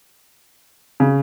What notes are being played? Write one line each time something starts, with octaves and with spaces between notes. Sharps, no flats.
C#3